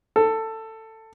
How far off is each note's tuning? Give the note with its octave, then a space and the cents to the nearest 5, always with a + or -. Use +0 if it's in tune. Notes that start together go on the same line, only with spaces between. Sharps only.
A4 +15